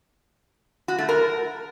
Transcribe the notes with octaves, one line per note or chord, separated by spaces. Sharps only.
F#4
A3
A#4